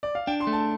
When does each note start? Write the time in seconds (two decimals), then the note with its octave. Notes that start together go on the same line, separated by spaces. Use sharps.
0.03 D5
0.15 F5
0.27 D4 G5
0.40 C6
0.47 A3
0.53 A5